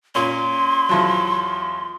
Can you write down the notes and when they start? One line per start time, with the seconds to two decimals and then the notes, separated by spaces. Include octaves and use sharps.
0.15 A#2 C#4 C6
0.89 E2 F3 F#3